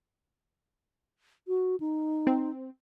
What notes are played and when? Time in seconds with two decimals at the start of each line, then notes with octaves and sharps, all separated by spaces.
1.48 F#4
1.80 D#4
2.27 C4